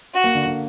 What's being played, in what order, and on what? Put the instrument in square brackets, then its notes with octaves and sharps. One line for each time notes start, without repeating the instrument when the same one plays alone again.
[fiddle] F#4
[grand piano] A#3
D3
D3